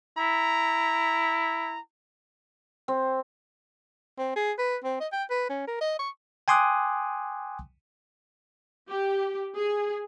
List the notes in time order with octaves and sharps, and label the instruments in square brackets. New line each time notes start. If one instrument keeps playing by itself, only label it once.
[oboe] E4 [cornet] A#5
[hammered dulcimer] C4
[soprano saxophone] C4
G#4
B4
C4
D#5
G5
B4
C#4
A#4
D#5
C#6
[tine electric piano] G5 G#5 C6 D6 D#6 F#6
[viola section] G4
G#4